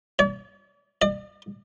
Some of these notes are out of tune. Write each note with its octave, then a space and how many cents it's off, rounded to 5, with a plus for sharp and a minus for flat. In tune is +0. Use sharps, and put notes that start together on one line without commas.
D5 -45
D5 +40